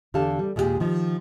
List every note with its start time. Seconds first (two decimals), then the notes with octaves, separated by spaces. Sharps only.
0.14 E2 D3 G4 F5 A5
0.39 G3
0.56 D#2 A#2 G#3 D4 G4 G#4
0.80 D#3 F3